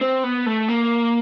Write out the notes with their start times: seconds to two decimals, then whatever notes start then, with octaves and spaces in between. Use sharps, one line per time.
0.01 C4
0.24 B3
0.46 A3
0.68 A#3